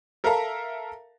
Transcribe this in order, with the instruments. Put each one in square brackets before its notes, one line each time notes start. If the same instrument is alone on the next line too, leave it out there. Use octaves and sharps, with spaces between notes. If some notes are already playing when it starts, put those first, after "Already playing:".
[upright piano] A4 A#4 E5 F5 A5 A#5